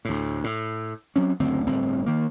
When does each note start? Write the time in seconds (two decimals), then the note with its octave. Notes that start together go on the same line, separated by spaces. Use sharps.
0.05 D2 A2
0.44 A2
1.16 F#3 C4 C#4
1.39 F#1 D2 C4
1.66 G1 A2 C4
2.06 D#3 A#3